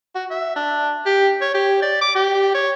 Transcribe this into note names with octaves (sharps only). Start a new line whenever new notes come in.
F#4
E5
D4
G4
C#5
G4
D5
D6
G4
C#5